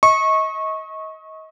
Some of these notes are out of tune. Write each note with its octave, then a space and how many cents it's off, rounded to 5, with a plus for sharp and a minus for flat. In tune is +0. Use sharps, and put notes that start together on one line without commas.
D#5 +30 C#6 -20